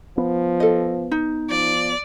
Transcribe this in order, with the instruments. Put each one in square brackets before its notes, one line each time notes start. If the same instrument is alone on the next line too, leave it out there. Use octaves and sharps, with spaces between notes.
[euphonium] F3 [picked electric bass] B3
[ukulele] A4 D#5
D#4
[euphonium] F3 [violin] D5